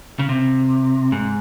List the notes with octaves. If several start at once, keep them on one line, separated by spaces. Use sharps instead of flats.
C#3
C3
G#2